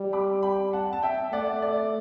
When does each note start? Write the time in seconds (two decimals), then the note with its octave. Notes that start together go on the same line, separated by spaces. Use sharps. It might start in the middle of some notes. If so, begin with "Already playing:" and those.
Already playing: G3
0.13 B5 D6
0.43 G5 B5
0.73 F#5 A5
0.93 A5
1.03 E5 G5
1.33 A3 D5 F#5
1.62 D5